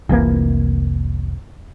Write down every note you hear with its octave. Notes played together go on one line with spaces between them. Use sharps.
F1 C2 E3 A#3